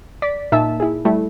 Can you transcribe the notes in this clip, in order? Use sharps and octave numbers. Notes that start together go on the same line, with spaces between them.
D5 B6
A#2 D#4 E5 A5 E6
E4 G#4
G3 A3 E4